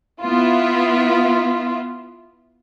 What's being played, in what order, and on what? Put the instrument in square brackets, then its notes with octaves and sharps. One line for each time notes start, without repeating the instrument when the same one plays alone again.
[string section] B3 E4 F4